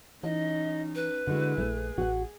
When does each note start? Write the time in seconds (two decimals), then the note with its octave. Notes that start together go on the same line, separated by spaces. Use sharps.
0.23 E3 C#4 D#4 D#5
0.95 B4
1.27 D3 G#3 E4 F#4
1.58 A#1 A3 G#4
1.98 A1 F#4 F#5